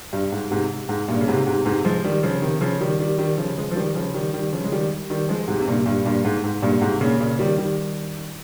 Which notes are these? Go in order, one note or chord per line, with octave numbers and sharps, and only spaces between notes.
G2
G#2
G#2 C3
G#2
G2 A#2
C#3
G#2 C3
G#2 C3
G#2 C3
F3 G#3
D#3 G3
C#3 F3
C3 D#3
C#3 F3
D#3 G3
D#3 G3
D#3 G3
C#3 F3
F3 G#3
F3
D#3 G3
C#3 F3
D#3 G3
D#3 G3
C#3 F3
G#3
D#3 G3
D#3 G3
F3 G#3
G#2 C3
C3
G2 A#2
G2 A#2
G2 A#2
G#2
G#2
G2 A#2
G#2 C3
A#2 C#3
A#2 C#3
D#3 G3
D#3 G3